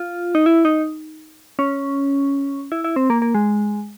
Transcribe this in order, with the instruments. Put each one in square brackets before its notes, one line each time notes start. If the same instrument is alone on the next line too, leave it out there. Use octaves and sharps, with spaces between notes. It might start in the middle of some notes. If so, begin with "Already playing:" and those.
Already playing: [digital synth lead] F4
D#4
E4
D#4
C#4
E4
E4
C4
A#3
A#3
G#3